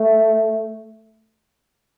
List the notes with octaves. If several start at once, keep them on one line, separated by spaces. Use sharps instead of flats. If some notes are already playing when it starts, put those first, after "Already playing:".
Already playing: A3